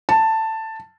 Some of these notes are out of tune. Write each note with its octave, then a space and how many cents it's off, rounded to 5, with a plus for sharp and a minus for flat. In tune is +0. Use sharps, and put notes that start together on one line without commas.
A5 +10